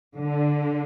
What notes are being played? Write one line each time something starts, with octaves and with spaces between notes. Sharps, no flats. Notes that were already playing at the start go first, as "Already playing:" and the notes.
D3